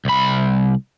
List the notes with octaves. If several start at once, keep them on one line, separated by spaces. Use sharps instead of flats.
C2 B5